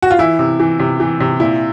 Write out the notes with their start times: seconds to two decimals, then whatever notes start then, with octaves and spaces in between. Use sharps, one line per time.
0.02 F#4
0.11 F4
0.19 E3 E4
0.39 C3
0.60 E3
0.79 C3
1.00 E3
1.20 C3
1.40 A#2 E4